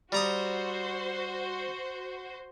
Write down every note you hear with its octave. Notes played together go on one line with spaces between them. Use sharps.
G3 F#4 C5 A#5 D#6